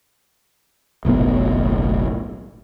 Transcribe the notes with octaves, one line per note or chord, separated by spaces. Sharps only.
F#1 B1 A2 B3